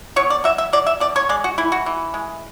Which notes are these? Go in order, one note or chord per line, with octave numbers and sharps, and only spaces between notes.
B2 C#5
D5
F#3 E5
E5
F#3 D5
E5
B2 D5
C#5
G#3 D5
F#4
E3 E4
F#4
E3
G#3